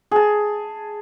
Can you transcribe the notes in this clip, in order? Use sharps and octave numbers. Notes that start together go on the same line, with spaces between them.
G#4 A5